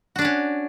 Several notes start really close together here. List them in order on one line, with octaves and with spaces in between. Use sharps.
F#4 D4 D5 C#4